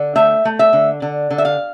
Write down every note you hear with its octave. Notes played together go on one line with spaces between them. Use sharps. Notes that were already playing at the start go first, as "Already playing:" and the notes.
Already playing: D3
A3 E5
A3
E5
D3
D3
D3
E5
F5